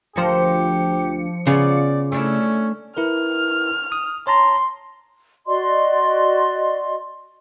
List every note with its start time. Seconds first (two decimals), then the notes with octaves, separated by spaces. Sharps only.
0.16 D2 F3 G4 A#4 C5 C#7
1.47 C#3 B3 F4 D5
2.12 A3 C#4 D4 E4
2.97 E4 A#4 B4 F6
3.92 D#6
4.27 C#5 A5 A#5 C6
5.47 F#4 D5 D#5 C6